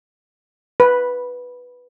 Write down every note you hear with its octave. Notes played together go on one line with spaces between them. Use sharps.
B4